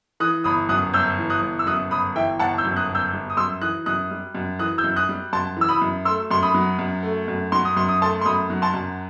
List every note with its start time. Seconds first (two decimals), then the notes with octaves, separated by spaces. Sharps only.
0.20 E3 D#6 F#6
0.44 G1 B5 D#6
0.69 F#2 D#6 F#6
0.93 G1 E6 G6
1.18 E3
1.30 D#6 F#6
1.42 G1
1.59 E6
1.66 F#2 D#6 F#6
1.91 G1 B5 D#6
2.16 E3 E5 G5
2.39 G1 F#5 A5
2.58 E6 G6
2.64 F#2
2.77 D#6 F#6
2.89 G1
2.95 E6 G6
3.13 G3
3.30 D#6
3.37 F#2 C6 E6
3.61 E3 D#6 F#6
3.86 F#2 D#6 F#6
4.11 G3
4.35 F#2
4.59 E3 D#6 F#6
4.78 E6 G6
4.84 F#2
4.96 D#6 F#6
5.09 G3
5.33 F#2 A5 C6
5.57 E3 E6
5.69 B5 D#6
5.81 F#2
6.05 A3 C6 E6
6.30 F#2 C6
6.43 B5 D#6
6.54 F#3
6.79 F#2
7.03 A3
7.28 F#2
7.52 F#3 C6
7.65 D#6
7.76 F#2 C6
7.89 D#6
8.01 A3 A5 C6
8.21 C6
8.25 F#2 B5 D#6
8.50 F#3
8.62 A5 C6
8.74 F#2